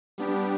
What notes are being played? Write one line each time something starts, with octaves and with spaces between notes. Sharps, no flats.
G3 B3 D4 G4